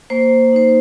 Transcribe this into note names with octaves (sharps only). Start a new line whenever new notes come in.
A#3 C5
D#4 C5